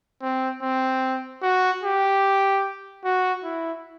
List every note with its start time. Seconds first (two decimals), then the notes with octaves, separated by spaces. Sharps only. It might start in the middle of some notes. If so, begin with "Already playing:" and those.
0.22 C4
0.62 C4
1.42 F#4
1.83 G4
3.05 F#4
3.44 E4